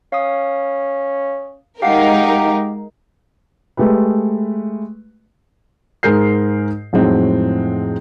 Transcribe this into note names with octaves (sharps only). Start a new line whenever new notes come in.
C#4 F5 D#6
G#3 D#4 G4 A#4 F5 F#5 C7
G#3 A3 G4 B4
G#2 G#4 A#4 G6 C7
F2 A2 F#3 G#3 C4 D#4